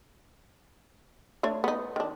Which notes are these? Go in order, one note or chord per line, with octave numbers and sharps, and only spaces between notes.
A3 D4 C#5
B3 D#4
D#3 D4